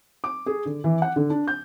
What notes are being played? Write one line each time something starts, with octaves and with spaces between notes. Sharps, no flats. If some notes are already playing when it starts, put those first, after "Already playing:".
D6
G#4
D3
E3
F#5
D3
D4
G6